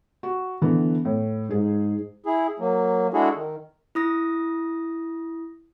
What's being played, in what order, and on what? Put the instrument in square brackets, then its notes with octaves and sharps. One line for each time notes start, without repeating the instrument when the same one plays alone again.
[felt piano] F#4
D3 E3 B3
A2
[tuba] G#2 [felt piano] G#4
[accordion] E4 G#4
F#3 A#3
G#3 D4 E4 F#4 G#4 A4
D#3
[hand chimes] E4 D#6 A#6